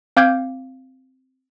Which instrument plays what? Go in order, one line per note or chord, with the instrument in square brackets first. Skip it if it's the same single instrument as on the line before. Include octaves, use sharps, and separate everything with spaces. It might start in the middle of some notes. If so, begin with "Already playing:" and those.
[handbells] C4 F5 G5 D6 G6 G#6